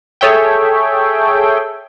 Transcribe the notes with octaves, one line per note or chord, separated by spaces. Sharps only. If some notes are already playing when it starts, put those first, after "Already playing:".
G#4 A4 C#5 E5 G5